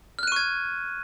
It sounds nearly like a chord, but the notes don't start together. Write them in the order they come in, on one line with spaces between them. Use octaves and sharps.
F6 F#6 D#7 C#6 G#6